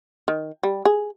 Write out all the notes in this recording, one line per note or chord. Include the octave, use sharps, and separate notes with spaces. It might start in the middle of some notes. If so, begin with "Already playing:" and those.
D#3
G3
G#4